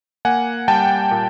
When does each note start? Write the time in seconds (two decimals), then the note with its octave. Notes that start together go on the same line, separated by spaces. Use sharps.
0.25 A#3 F#5 G#5
0.68 G3 G5 A5
1.11 A#2